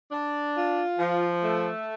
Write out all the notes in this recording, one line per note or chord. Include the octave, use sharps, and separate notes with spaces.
D4
F4
F3
A3